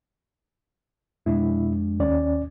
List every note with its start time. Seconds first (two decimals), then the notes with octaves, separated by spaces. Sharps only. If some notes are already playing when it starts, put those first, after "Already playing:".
1.26 F2 B2 G#3 D4 E4
2.00 D#2 C#4 D5